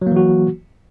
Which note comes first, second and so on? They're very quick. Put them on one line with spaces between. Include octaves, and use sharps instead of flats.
F#3 A#3 E3 F#4